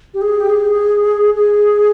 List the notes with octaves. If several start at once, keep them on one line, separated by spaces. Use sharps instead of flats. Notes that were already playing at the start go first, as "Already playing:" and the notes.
G4
G#4
G4
G#4
G#4